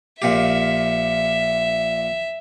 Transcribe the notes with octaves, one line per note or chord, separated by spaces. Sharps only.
A#1 A#2 G4 E5